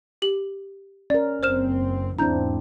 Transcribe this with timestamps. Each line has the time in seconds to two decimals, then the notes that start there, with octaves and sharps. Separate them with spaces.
0.22 G4 F#7
1.10 C#4 A#4 D5
1.43 F#1 C4 C5 F6 E7
2.19 E2 G#2 C4 D4 E4 A#5 G6